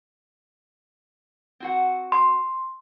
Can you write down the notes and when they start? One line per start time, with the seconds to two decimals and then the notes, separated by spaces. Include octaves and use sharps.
1.60 C4 F#4 F#5
2.12 C6